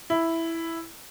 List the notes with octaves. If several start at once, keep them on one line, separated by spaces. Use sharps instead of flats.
E4